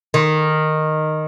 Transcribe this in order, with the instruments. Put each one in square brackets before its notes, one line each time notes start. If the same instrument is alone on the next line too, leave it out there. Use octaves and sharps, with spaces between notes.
[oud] D#3